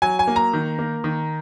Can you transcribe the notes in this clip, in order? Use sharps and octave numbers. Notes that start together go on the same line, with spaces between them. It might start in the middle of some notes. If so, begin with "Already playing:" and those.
F#3 G#5
G#5
A#3
A#5
D#3
A#3
D#3